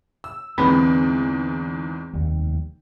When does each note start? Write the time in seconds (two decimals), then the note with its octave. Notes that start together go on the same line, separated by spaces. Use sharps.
0.24 E6
0.58 E2 G#2 D3 E3 A#3 C4 B4 B5
2.13 F1 D#2 G3